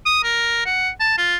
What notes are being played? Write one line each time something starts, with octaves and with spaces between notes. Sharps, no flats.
D#6
A#4
F#5
A5
F4